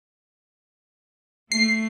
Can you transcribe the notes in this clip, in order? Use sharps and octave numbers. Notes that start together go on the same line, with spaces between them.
A3 C7